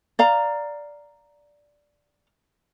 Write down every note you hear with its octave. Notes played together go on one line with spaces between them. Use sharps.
D5 F5 A#5